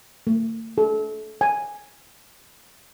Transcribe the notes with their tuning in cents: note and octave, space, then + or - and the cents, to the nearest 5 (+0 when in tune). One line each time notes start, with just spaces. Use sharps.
A3 +45
A4 -30
G#5 -5